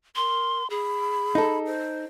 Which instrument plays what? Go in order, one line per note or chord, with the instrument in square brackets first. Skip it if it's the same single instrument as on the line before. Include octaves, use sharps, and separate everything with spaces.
[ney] A#4 [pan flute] C6
[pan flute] G#4 [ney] B5
[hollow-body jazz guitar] D#4 A4
[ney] C5